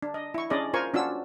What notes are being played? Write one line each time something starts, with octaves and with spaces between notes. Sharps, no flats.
D4
D#5
E4 C#6
C#4 D4 G#4 D5 D#5
F4 A#4 C5 G#5 C#6
C#4 D4 F4 F#4 E6